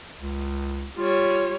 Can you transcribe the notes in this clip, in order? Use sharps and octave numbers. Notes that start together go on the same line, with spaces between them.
C#2
G3 F4 C#5